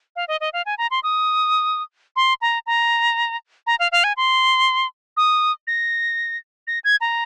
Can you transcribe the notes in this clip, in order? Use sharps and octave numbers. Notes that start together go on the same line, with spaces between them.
F5
D#5
D#5
F5
G#5
A#5
C6
D#6
C6
A#5
A#5
A#5
F5
F5
G#5
C6
D#6
A#6
A#6
G#6
A#5